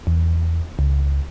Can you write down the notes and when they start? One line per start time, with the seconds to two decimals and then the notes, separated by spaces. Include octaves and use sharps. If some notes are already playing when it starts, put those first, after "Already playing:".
0.07 E2
0.79 C#2